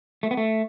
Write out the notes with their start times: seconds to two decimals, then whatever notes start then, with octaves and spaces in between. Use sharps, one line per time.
0.23 A3
0.31 B3
0.37 A3